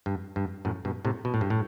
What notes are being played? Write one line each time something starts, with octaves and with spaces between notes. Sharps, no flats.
G2
G2
F#2 A2
G2 B2
A2 C3
B2
A2
G2
A2